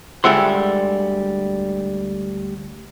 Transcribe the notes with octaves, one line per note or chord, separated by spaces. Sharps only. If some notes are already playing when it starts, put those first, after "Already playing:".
D2 G3 G#3 E5 F#5 C6